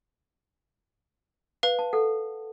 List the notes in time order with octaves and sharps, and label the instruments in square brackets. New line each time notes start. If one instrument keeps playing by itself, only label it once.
[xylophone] B4 F5
[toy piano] A5
A4 F#5